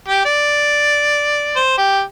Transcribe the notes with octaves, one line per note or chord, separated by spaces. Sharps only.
G4
D5
C5
G4